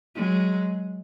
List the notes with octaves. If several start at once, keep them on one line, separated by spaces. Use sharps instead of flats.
F#3 G#3